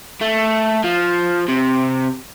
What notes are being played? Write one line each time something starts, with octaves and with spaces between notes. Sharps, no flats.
A3
F3
C3